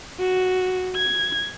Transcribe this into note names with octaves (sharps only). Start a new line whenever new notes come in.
F#4
G#6